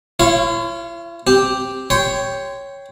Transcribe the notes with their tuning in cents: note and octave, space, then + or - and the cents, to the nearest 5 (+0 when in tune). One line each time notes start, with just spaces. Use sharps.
E4 +45 C#5 -20 F5 -20
C4 +0 G4 +0
C#5 +0 G5 +0 C6 -20